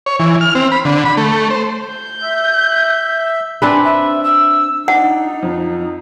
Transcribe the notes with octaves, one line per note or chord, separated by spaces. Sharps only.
C#5
E3
F6
C4
B5
D3
B5
A3
C5
G6
E5
C4 D4 B4 G#5
E5
E6
D4 D#4 F#5
F2